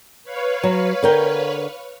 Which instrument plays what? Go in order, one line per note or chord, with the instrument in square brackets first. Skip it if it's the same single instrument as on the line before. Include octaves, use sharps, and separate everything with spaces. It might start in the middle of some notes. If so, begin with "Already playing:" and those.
[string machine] B4 C#5 F5
[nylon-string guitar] F#3
D3 A#4 G5